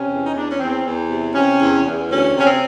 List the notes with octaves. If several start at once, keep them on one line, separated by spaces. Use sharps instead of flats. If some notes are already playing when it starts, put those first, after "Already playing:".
Already playing: C3 C#4
E2
D#4
E2 D4
C#4
E2 C4
E2
C3
C3 C#4
E2
E2
D2 C#4
C3 C#4
C4